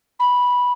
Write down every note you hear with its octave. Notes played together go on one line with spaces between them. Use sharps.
B5